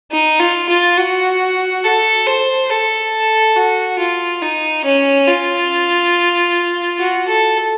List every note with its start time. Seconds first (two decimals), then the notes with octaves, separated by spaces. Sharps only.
0.11 D#4
0.40 F4
0.69 F4
0.98 F#4
1.84 A4
2.27 C5
2.70 A4
3.56 F#4
3.99 F4
4.42 D#4
4.85 C#4
5.28 F4
6.99 F#4
7.28 A4